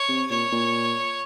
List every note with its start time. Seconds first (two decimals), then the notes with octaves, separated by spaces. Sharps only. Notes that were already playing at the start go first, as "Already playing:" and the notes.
Already playing: C#5
0.09 C3
0.30 A#2 C#5
0.52 A#2